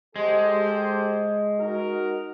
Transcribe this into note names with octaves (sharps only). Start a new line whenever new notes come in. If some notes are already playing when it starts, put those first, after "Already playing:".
G#3 G4 A4 C5
D#4 F#4 A#4